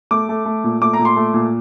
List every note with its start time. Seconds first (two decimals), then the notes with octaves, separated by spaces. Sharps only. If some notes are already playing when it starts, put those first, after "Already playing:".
0.11 A3 D6
0.29 A3
0.45 A3
0.64 A#2
0.82 A3 D6
0.93 A#5
0.99 A#2
1.05 C6
1.16 A3
1.34 A#2